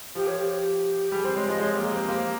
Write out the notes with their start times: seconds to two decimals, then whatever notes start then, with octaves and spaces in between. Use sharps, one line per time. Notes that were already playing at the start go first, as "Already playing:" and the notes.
0.15 F3 G4
0.27 C#5
0.40 G4
0.52 G4
1.12 G3 G#4
1.24 C4 C5
1.36 G#3 C#5
1.48 F3 D#5
1.60 G#3 C#5
1.72 A#3 G4
1.84 G#4
1.92 C4 G4
2.08 A#3 G4